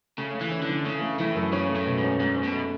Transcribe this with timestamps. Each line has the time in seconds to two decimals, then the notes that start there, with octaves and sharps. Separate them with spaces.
0.18 C#3 A3
0.35 A3
0.41 E3
0.51 C#4
0.62 D3
0.69 E3
0.85 C#3 A3
1.02 A3
1.19 A2 E3
1.35 F#2
1.52 C#3 C#4
1.69 A3
1.75 A2
1.86 B2
1.98 G#2
2.04 C#4
2.20 G#2 C#4
2.37 C#4
2.43 B2
2.53 A3